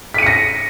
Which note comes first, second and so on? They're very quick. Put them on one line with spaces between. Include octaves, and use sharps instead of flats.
B6 D#7 C#7 A#6